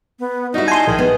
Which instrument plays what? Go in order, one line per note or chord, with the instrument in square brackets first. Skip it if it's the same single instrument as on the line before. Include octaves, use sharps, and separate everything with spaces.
[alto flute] B3
[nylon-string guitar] G3 E4 [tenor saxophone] D#4 [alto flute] F#4
[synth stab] G#5 C6 [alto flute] A5
[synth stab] A#1 [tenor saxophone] D#3 [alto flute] G#4
[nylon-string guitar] B3